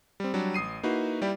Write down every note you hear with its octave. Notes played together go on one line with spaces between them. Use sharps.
G3 C4
F#3 G3 D4
A1 D#6 C7 D#7
A#3 D#4 E4 F#4 B4
G3 E4 G4 D5